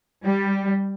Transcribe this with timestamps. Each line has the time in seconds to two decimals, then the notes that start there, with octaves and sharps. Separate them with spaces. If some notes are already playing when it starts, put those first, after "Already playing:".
0.24 G3